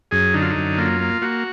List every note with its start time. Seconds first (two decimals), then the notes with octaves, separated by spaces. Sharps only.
0.11 F#2 G#4
0.34 D3 D#4
0.42 F4
0.50 D#4
0.57 F#2
0.78 A#3 F4
1.01 A#3
1.22 A#3 F#4